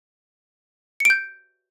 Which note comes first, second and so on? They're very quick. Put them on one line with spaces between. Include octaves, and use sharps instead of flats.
C#7 D7 G6